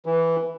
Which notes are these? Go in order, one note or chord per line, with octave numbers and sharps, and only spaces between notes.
E3